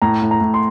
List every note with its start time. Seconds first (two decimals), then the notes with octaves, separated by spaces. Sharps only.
0.02 A2 A#5
0.22 A2
0.31 A#5
0.40 A2
0.54 C6